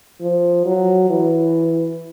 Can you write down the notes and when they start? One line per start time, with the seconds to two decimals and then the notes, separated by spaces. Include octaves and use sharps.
0.21 F3
0.66 F#3
1.10 E3